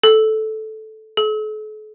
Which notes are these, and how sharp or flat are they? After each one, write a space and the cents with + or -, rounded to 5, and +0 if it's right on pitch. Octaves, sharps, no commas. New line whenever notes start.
A4 -10
A4 -45